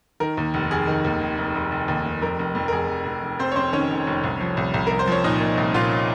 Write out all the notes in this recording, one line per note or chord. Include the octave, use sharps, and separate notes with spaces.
D#3 A#4
D#2
F1
F1 G#4
D#3
D#2
F1
F1
F1
F1
D#2
F1
F2 A#4
F1
F2
A#4
F1 G#4
F1
F1
F1
F1 C4 C5
C#5
F1 C4 C5
D#3 C#4 C#5
F1
F1
C2
F3
C2
C2
C2 A#4
C5
F3 C#5
A#2 D#4 D#5
A#2
C2
A#2 F4 F5